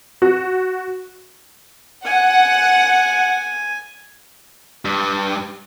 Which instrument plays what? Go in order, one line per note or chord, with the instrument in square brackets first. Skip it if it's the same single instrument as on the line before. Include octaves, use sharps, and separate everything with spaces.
[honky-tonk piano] F#4
[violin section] F#5 [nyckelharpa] G#5
[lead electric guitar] G2